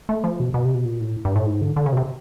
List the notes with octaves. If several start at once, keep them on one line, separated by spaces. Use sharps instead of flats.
A3
F3
B2
B2
C3
B2
A#2
A2
G2
A2
G#2
D3
D3
C#3
B2
C3